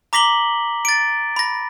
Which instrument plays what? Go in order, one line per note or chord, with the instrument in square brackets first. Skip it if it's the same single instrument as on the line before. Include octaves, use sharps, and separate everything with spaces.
[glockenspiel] A#5 D6 A#6 B6 F#7 G7
A6 D7
B5 A#6